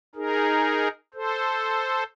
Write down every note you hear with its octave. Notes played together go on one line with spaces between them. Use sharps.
D#4 G#4 A#4
A4 C5